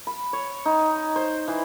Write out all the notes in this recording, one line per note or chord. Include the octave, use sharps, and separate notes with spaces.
B5
C#5
D#4
C5
E3